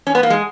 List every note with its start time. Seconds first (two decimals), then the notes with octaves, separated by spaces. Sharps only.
0.07 C#4
0.15 B3
0.23 A#3
0.30 G#3